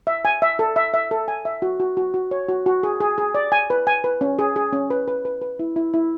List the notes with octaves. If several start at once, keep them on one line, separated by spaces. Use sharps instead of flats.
E5
G#5
E5
A4
E5
E5
A4
G#5
E5
F#4
F#4
F#4
F#4
C#5
F#4
F#4
G#4
G#4
G#4
D5
G#5
B4
G#5
B4
C#4
G#4
G#4
C#4
B4
B4
B4
B4
E4
E4
E4